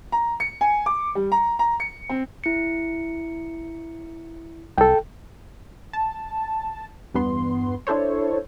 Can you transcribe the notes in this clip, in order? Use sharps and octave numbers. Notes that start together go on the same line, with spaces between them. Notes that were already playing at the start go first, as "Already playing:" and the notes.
A#5
C#7
G#5
D6
G3
A#5
A#5
C#7
C4
E4 C#7
C2 A4 G5
A5
E2 G2 B3 C6
D4 E4 A4 C5 C#5